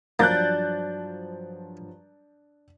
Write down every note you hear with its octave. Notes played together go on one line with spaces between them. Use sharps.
G2 F3 F#3 A#3 D4 F#6 G6 A6